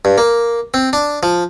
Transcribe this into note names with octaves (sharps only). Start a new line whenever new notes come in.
G2
A#3
C4
D4
F3